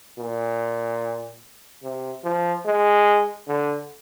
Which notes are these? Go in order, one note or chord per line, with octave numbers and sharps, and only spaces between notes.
A#2
C3
F3
G#3
D3